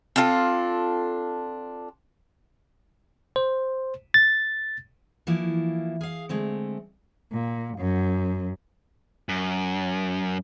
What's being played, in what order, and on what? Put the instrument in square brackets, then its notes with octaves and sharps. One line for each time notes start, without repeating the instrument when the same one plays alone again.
[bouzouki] C4 D4 F4 A4
[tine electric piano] C5
A6
[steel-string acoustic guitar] E3 F3 A#3 E4
G#4 F5
D3 G#3 A3 C4
[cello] A#2
F#2
[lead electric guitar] F#2